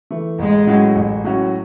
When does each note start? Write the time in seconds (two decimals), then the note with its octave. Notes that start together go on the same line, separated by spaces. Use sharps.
0.11 E3 A3
0.39 A1 G#3
0.67 A2 F#3 C#4 F#4
0.96 A1
1.25 A2 F#3 C#4 F#4